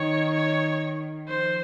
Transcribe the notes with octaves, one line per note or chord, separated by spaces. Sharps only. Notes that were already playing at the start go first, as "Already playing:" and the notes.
Already playing: D#3 C#5
C#5
F3 C5